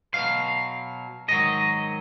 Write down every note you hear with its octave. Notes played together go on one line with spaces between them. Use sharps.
B2 F#3 F5
G#2 D#3 F#3 D#5